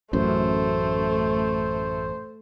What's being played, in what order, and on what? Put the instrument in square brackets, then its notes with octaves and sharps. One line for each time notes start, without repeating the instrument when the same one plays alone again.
[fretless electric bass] A1 F#2 [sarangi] A3 [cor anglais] C5